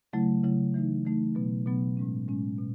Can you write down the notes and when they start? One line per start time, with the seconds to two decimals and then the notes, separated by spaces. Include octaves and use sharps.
0.13 C#3 F#3 A3 E4
0.43 C#3 F#3 A3 E4
0.74 E3 A3 D#4
1.05 E3 A3 D#4
1.35 B2 F#3 B3
1.66 B2 F#3 B3
1.97 A2 G#3 C#4
2.28 A2 G#3 C#4
2.58 B2